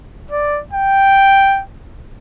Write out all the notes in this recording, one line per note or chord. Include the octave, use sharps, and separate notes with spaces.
D5
G5